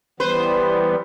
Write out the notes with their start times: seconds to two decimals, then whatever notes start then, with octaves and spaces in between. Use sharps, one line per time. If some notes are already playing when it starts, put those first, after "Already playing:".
0.20 E3 G3 B3 B4 C5